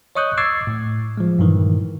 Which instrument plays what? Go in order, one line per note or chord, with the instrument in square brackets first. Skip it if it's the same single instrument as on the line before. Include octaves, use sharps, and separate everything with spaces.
[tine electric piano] C#5 D#5 C#6 D#6 F#6 G6
C#6 D6 E6 G#6 A6 C7
A2
F3 G#3
G2 A#2 D#3 E3